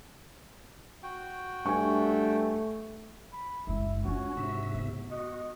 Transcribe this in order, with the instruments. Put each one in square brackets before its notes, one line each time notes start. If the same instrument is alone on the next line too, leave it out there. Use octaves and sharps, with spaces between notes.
[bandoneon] F#4 G5
[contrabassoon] G2 [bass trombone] A3 [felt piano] G#5 C#6
[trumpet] B5
[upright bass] F#1 G#3 [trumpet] E4
[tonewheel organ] C#4 [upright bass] D4 F4 [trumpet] F#4
[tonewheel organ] G#2 C3 E5
[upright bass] B3
[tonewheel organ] F#4 [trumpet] D#5